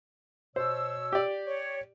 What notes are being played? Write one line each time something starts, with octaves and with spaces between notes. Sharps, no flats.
B2 C5 C#5 E6
G4 D5
C#5